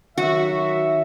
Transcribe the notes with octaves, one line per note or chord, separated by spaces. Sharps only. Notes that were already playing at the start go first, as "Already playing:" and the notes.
D#3 F#3 F#4 E5